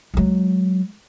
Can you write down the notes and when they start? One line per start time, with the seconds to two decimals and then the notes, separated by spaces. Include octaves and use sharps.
0.14 F#3 G#3